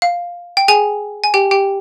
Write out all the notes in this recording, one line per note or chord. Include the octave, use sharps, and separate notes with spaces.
F5
G5
G#4 G#5
G#5
G4 G5
G4 G5